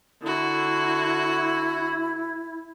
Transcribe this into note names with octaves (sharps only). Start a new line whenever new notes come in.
D3 E4 F#4